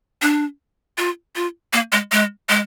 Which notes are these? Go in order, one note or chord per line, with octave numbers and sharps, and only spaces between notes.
D4
F4
F4
A#3
G#3
G#3
G#3